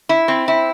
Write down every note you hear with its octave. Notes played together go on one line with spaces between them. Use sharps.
E4
C4
E4